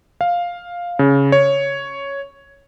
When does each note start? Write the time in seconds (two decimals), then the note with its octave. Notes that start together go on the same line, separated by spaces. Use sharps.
0.21 F5
0.99 C#3
1.32 C#5